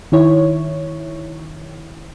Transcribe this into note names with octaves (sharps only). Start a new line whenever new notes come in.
D#3 E4 C#5